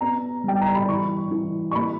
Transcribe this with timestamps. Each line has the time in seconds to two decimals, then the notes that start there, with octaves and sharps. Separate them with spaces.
0.01 B3 A#5
0.44 G3 G5
0.61 A#5
0.75 B5
0.88 E3 C#6
1.31 E3
1.71 C#6
1.75 A#3 B5